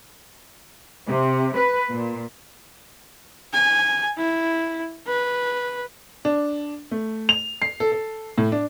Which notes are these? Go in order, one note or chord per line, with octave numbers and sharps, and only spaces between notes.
C3
B4
A#2
G#5
E4
B4
D4
A3
F7
C7
A4
A4
A2
D4